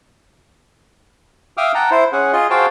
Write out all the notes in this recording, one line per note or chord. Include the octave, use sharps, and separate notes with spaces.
E5 F5 G5 D6 D#6 F6
F#5 G5 A5 A#5
E4 C5
C#4 G#4 F#5
F4 G#4 D#5
F#4 G#4 C5 F5 G5 A5